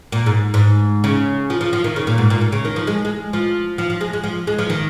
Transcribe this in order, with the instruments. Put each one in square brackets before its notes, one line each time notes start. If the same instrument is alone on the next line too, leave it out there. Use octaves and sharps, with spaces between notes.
[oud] A#2
G#2
G#2
C#3
F3
F3
F3
D#3
C#3
A#2
G#2
A#2
A#2
C#3
D#3
F3
G#3
G#3
F3
F3
F3
G#3
G#3
F3
G#3
F3
D#3